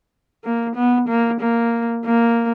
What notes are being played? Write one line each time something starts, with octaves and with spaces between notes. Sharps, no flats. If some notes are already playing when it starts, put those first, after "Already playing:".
A#3
B3
A#3
A#3
A#3